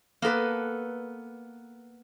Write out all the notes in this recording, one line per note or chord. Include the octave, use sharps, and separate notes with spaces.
A#3 B3 A4 B4